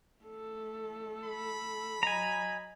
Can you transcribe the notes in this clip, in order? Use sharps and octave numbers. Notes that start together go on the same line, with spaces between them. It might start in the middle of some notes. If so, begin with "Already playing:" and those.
A3 A4
B5
F#3 D#5 G#5 A#5